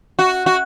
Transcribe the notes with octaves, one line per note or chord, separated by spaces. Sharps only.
F#4
F#4